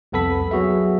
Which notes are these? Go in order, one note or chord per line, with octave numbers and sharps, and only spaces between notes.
C2 F2 B3 A4 B5 B6
F#3 B3 F#4 G#4 E5